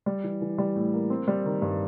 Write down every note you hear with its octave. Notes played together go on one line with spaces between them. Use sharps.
G3
E3
E3
G3
A2
A#3
C4
G3
D#3
G2